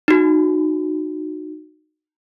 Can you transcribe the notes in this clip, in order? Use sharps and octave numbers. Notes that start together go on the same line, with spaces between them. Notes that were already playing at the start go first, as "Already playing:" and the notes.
D#4 F#4